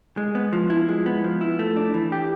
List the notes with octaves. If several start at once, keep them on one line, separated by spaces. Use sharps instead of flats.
G#3
B3
F3
E4
G#3
B3
F3
E4
A3
D4
E3
G4